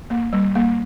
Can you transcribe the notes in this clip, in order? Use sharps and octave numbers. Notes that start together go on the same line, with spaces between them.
A#3
G3
A#3